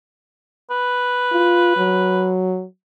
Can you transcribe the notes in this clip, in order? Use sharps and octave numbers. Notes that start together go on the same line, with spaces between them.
B4
F4
F#3